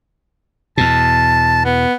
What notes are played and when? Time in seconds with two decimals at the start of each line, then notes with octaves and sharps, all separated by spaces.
0.77 E2 B2 A5
1.65 B3